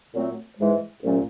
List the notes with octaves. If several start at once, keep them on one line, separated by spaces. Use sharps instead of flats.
A#2 F#3 A3 C4
G#2 E3 G#3
C2 A#2 F#3 A3 C#4